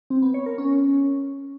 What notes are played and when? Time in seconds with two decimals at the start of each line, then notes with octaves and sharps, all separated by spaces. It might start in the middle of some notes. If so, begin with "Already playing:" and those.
0.10 C4
0.22 B3
0.34 C#5
0.46 A#4
0.58 C#4